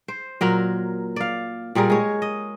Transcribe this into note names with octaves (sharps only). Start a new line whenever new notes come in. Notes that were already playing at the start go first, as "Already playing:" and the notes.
C5
A#2 F#3 A#4
D5 F5
A#2 G3 G#4 A#4
G#3 C#5
D#5